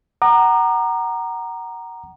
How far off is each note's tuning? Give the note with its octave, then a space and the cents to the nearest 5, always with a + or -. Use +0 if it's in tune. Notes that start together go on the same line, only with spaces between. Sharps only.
F#5 +25 A#5 +5 D6 +45